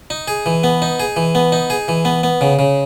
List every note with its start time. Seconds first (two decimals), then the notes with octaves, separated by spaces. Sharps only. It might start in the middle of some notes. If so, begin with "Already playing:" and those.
0.10 D#4
0.28 G#4
0.46 E3
0.64 B3
0.82 D#4
1.00 G#4
1.16 E3
1.35 B3
1.52 D#4
1.70 G#4
1.88 E3
2.05 B3
2.23 B3
2.41 C#3
2.59 C#3